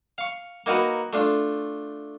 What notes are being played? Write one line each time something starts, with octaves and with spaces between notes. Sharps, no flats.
F5 C#6
A#3 D#4 F#4 A#4 B4
A3 D4 F4